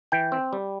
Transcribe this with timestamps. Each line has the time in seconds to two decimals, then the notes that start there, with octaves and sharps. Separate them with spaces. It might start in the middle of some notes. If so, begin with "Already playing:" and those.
0.12 E3 G5
0.32 C4
0.53 G3